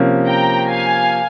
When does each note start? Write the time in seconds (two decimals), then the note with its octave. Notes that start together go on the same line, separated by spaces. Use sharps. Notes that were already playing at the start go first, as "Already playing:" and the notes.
Already playing: C3 F3 A#3 C#4
0.27 G5 A#5
0.69 F5 G#5